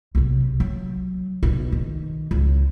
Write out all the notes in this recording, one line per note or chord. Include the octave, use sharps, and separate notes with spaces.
B1 C3
F#3
B1 B2
D#3
C#2